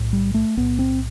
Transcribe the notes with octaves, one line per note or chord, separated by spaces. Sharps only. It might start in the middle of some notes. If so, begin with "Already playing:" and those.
Already playing: B1 A2
G3
A3
B1 A2 B3
C4